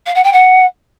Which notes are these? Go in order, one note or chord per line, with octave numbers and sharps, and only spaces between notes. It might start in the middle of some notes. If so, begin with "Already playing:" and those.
F5
F#5
G5
F#5